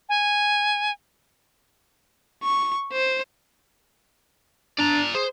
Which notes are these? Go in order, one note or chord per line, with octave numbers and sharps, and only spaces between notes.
G#5
C#6
C5
D4 D5 A#5
G#4 C5